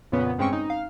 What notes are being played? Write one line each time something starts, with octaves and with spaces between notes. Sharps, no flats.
F2 A#2 C#3 B3 C#4
G2 G#3 C4 C#4 G5 C#6
D#4
F5